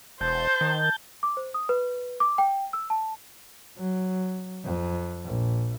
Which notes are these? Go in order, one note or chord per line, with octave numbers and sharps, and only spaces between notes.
E1 C5 A5 G6
D#3
D6
C5
D#6
B4
D6
G5
E6
A5
F#3
F2
A#1